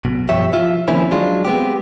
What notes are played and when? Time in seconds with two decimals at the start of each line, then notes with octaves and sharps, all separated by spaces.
0.05 B1 B2
0.29 G2 F3 G4 C#5 E5
0.53 F3 F4 E5
0.88 D#3 F3 A#3 C4 C#4 E4
1.11 F#3 G#3 D4 F4
1.45 G#3 B3 C4 G4